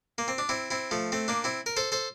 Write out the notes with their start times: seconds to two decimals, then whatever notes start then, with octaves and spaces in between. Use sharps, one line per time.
0.18 A#3
0.28 C4
0.38 D4
0.49 C4 E4
0.71 C4 E4
0.91 F3 A3
1.12 A3 C4
1.28 A#3 D4
1.44 C4 E4
1.66 A#4
1.77 A4 C5
1.92 A4 C5